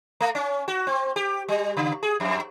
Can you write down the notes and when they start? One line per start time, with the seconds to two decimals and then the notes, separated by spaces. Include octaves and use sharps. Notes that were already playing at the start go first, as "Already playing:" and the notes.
0.20 A3
0.35 C#4
0.68 F#4
0.87 C4
1.16 G4
1.48 G3
1.77 C#3
2.03 G#4
2.20 F2